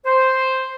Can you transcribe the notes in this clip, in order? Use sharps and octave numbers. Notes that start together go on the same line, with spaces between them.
C5